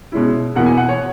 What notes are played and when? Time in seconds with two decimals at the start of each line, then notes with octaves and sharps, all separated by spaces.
0.12 B2 G#3 C#4 E4
0.55 E2 B2 A#3 E4 F#5
0.66 G#5
0.77 F#5
0.89 C#5